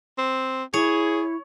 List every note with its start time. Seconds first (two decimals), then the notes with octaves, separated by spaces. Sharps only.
0.18 C4
0.74 E4 G#4 C#5